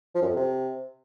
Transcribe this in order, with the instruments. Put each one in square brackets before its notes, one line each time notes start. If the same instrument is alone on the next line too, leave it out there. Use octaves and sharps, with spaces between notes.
[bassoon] F3
F#2
F2
C3